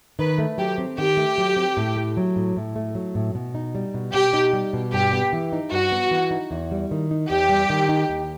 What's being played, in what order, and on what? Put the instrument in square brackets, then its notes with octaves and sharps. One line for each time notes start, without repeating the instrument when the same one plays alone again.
[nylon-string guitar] D#3 [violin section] B4
[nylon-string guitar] A3
[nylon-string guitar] F#3 [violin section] G4
[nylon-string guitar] C4
[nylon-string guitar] D#3 [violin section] G4
[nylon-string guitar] A3
F#3
C4
A2
A3
F#3
A2
A2
A3
F#3
A2
B2
D#4
G3
B2
[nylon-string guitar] B2 [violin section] G4
[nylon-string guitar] D#4
G3
B2
[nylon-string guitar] G2 [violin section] G4
[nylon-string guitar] B3
E3
D#4
[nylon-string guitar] G2 [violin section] F#4
[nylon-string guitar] B3
E3
D#4
E2
G3
D#3
D#4
[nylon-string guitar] E2 [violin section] G4
[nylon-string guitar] G3
D#3
D#4
D#2